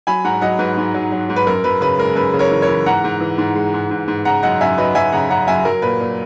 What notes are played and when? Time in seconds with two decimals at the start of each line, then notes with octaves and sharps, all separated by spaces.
0.07 F#3 G#5 B5
0.24 G#2 F#5 A#5
0.41 F#3 D#5 F#5
0.59 G#2 B4
0.77 G#2
0.94 F#3
1.12 F#3
1.29 G#2
1.36 B4
1.47 F#2 A#4
1.64 F#2 B4
1.81 C#3 B4
1.99 G#3 A#4
2.16 F#2 B4
2.33 C#3
2.39 A#4 C#5
2.51 E3
2.62 A#4 C#5
2.68 E3
2.86 G#2 F#5 A#5
3.04 G#2
3.21 E3
3.38 G#2
3.56 G#3
3.74 G#2
3.91 G#2
4.08 G#2
4.25 C#3 F#5 A#5
4.43 F#2 D#5 F#5
4.61 F#2 E5 G#5
4.78 F#3 B4 D#5
4.95 F#2 E5 G#5
5.12 C#3 F#5 A#5
5.30 C#3 F#5 A#5
5.47 F#2 E5 G#5
5.65 F#3 A#4
5.82 A#2 B4
6.01 A#2